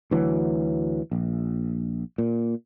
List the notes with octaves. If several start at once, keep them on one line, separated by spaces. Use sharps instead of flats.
D2 E3 F#3
A#1
A#2